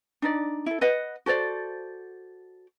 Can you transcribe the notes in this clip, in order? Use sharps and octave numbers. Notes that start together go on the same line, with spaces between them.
D4 D#4 D5
E4 A4
B4 D#5 F#5
F#4 A4 C5 D5